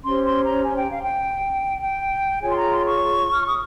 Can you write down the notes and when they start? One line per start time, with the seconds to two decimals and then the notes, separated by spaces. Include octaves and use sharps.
0.04 C#4 G4 C5 C6
0.25 C6
0.44 A#5
0.63 G#5
0.77 G5
0.90 F5
1.02 G5
1.82 G5
2.42 F4 G#4 C#5 G#5
2.52 C6
2.56 A#5
2.71 C6
2.85 C#6
3.32 F6
3.46 D#6